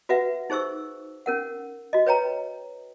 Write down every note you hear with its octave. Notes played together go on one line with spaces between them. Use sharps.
F#4 B4 E5 F#5
D#4 G#4 C5 C#6 E6
C#4 A#4 F#5
F#4 D#5
B4 C#5 G5 A#5